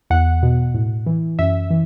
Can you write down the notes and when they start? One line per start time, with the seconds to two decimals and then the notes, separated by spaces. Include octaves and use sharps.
0.10 E2 F#5
0.43 B2
0.74 A2
1.06 E3
1.39 F#2 E5
1.70 E3